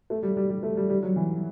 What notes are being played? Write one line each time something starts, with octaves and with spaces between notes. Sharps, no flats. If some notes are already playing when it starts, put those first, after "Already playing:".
A3
G3
G3
G3
A3
G3
G3
F#3
E3